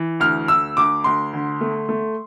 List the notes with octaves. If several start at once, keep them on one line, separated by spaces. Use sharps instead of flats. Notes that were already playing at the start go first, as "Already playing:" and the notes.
Already playing: E3
D2 F6
D2 E6
D2 D6
D2 C6
D3
A3
A3